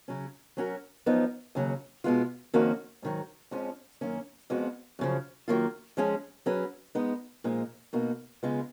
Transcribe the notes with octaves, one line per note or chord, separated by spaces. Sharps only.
C#3 F#3 C#4
F#3 C#4 F#4 A#4
F#2 F3 B3 D#4
D#2 C#3 F#3
B2 G#3 B3 F4
F2 D#3 A#3 C#4 F#4
G#2 D#3 F#3
F2 F3 G#3 C#4
F#2 D#3 A#3 C#4
F2 F3 G#3 B3 F#4
F#2 C#3 F3
F#2 D#3 F#3 A#3 F4
F3 G#3 C#4 G#4
F#3 C#4 G#4 B4
G#3 B3 D#4
A#2 F3 G#3 D#4
B2 A#3 D#4 F#4
C#3 G#3 B3 F4